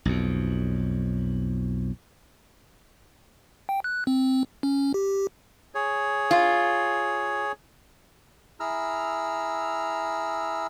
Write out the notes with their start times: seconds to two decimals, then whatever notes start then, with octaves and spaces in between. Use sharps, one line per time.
0.05 B1 F2
3.69 G5
3.84 F#6
4.07 C4
4.63 C#4
4.94 G4
5.75 G#4 C#5
6.31 F4
8.60 E4 G#4 A#5 E6 F6